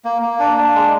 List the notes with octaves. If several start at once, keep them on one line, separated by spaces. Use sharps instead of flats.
A#3
A#3
D4
D4
G#3